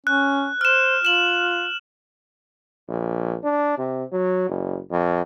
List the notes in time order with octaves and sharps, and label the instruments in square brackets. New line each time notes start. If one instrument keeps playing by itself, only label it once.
[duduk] C#4 [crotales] F#6
[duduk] C5 [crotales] F6 E7
[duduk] F4 [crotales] E7 F#7
[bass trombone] A#1
D4
C3
F#3
F#1
F2